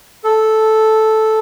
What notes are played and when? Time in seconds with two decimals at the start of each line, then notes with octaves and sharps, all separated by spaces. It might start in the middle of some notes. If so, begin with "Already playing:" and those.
0.24 A4